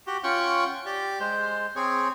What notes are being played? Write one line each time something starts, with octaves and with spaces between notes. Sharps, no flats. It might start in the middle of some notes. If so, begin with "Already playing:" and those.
F#4 G4
C#4 F4 F#5 G5 C#6
G4 D5
G#3 C5
C4 G#4 C#5